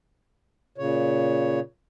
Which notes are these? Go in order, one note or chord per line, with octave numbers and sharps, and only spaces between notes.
A#2 C#3 C#5